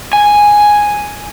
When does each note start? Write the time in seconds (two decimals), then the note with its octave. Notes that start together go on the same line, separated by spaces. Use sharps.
0.13 G#5